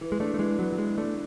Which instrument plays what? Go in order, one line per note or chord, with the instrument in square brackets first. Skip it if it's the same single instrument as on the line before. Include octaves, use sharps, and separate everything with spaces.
[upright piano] E3
[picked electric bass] G#3
[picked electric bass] A3 [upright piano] D4
[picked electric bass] A3
[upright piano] E3 [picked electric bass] G#3
[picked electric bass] F#3 [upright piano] B3
[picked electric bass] F#3
[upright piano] E3 [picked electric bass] G#3
[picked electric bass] A3 [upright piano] D4